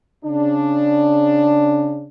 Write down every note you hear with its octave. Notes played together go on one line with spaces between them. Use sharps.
C#3 D4